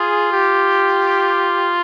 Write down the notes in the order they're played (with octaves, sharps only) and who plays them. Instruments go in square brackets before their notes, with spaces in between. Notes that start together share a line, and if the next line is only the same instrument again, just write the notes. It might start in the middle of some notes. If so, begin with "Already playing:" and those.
Already playing: [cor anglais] F4 [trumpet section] G#4
[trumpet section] G4